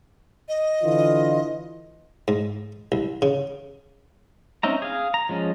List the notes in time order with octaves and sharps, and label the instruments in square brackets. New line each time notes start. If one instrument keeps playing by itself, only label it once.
[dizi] D#5
[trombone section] D3 E3 F4
[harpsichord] G#2
C2
C#3
[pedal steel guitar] C4 C#4 D#4 E5 A#5
G#4 F5
A#5
F3 G#3 C#4